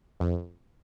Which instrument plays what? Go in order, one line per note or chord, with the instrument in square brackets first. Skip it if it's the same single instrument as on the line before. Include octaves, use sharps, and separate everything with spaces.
[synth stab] F2